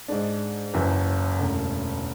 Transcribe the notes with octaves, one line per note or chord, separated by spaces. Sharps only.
G#2 G#3 D4
F#1 F#2 E3
E1 D2 C#3